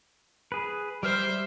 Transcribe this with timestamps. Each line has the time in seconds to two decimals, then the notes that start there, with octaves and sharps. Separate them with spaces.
0.52 G#4 B4
1.03 G3 C5 E5 F6